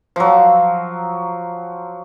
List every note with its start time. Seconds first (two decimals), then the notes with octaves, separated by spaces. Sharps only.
0.16 F3 F#3